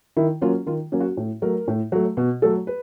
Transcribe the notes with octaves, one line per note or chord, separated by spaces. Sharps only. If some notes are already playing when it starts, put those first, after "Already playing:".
D#3 E4
F#3 A#3 C#4 F4
D#3 F4
F#3 A#3 C#4
F#4
A2
F#3 A3 A#4
A2
F#3 A3
B2
F#3 A3 A4
B4